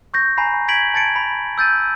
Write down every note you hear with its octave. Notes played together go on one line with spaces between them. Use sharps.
C#6 G6 A#6
G#5 A#5 B5 C7
G#6 B6 D7 F#7
A5 G#6 A6 C#7 D7
B5
E6 G6 A6 D#7